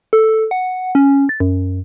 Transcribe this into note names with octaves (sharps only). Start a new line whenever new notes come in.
A4
F#5
C#4
A6
F#2